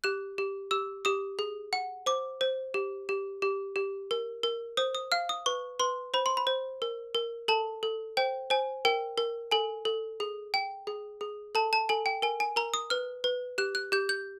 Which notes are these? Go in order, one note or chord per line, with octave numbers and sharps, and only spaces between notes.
G4 F#6
G4
G4 E6
G4 D#6
G#4
F#5
C5 D6
C5
G4
G4
G4
G4
A#4
A#4
C5 D#6
D#6
F5 F6
D#6
B4 C#6
B4 C6
C5 B5
C6
B5
C5
A#4
A#4
A4 A5
A4
C5 G5
C5 G#5
A#4 G5
A#4
A4 G#5
A4
G#4
G5
G#4
G#4
A4 A5
A5
A4 G#5
G5
A#4 G#5
G#5
A#4 A#5
D#6
B4 F6
B4
G4 F#6
F#6
G4 G6
G6